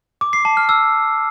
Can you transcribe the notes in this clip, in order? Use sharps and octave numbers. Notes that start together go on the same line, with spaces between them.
D6
C7
A5
F6
E6